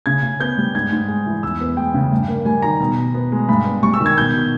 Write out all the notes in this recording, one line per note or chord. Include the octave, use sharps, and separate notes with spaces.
C#3 G#6
C#3
B3 G6
G3
G#2 G#6
G#2
G#3
E3
E2 E6
B3
G#3 G5
C#3
G2
A#3
G3 G#5
D#3 A#5
B2
B2
B3
G#3
G2 B5
B3
G3 C#6
E6
D#3
G#6
B2 G6
B2